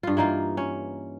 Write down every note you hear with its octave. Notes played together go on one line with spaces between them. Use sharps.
G2 F4
E3 A#3 D#4 F4
C#4